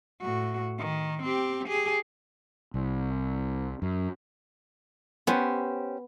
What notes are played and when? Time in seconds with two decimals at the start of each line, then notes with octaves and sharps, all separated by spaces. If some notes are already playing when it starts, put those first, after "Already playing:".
0.21 A2 F#4
0.79 D#3
1.23 C4 G4
1.68 G4 G#4
2.74 C2
3.82 F#2
5.27 B3 C#4 G4 C5